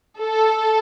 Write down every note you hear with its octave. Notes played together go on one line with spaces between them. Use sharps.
A4